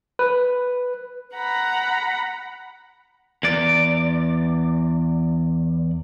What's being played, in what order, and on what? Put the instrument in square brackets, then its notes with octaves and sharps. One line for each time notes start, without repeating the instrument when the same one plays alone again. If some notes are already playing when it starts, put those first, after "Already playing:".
[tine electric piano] B4
[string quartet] F#5 A#5 B5
[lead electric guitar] E2 D5